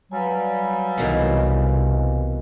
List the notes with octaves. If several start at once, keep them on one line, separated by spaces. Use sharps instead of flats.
F#3 G3 B4 F5 G#5
C2 B2 D#3 E3